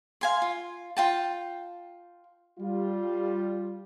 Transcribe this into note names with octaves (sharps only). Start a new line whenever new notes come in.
F5 G#5 C6
F4
F4 G5 A5
G3 F4